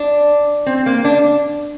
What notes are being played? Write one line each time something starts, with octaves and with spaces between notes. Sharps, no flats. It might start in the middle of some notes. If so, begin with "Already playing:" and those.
Already playing: D4
C4
A#3
D4